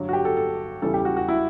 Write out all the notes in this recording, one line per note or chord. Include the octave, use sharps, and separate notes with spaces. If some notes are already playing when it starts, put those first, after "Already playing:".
Already playing: G2 D3 F#3
F#4
G4
A4
A4
E2 C#3 E3 G3 A4
G4
F#4
F#4
E4